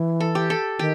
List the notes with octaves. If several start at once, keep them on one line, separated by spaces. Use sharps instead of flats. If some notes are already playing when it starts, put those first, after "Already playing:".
Already playing: E3
A4
G4
A4
D#3 G4